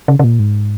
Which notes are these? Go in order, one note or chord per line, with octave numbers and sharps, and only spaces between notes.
C#3
C#3
A#2
G#2